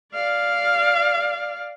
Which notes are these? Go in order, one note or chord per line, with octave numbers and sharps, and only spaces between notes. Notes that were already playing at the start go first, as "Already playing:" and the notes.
D5 F5